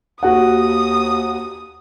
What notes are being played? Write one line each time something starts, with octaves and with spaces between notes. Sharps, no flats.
D#2 F#4 F#5 D#6